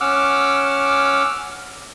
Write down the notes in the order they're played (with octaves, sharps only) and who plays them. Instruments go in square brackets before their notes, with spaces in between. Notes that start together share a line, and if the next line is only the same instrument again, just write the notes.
[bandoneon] C#4 F#5 D6 E6 F6